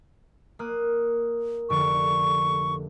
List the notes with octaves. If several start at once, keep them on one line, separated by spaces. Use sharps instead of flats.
A#3 D#6 F#6
F1 D3 C#6 D7